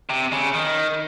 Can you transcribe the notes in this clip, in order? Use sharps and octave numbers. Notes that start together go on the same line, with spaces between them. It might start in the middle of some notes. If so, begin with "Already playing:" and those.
C3
C#3
D#3